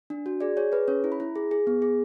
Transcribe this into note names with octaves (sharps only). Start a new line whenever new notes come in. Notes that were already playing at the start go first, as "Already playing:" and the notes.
D4
F#4
G#4 D5
G#4 C#5
G#4 B4
C#4 C#5
E4
B5
E4
G#4
G#4
B3
G#4